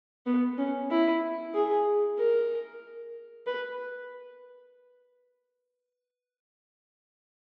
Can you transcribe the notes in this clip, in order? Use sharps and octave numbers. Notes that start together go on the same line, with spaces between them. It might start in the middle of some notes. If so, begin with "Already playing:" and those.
B3
C#4
E4
G#4
A#4
B4